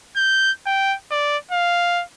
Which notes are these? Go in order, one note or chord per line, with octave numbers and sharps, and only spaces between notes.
G6
G5
D5
F5